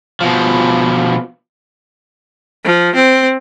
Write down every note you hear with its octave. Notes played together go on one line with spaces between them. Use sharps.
B2 F3
F3
C4